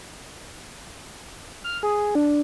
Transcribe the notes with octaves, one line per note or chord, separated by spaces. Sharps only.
F6
G#4
D4